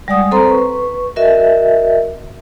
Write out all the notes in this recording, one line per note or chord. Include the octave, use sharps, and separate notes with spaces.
G3 G#3 D5 F#5 D#6
C4 A4 C5 A#5 C6
B4 C#6
F#4 A#4 D#5 E5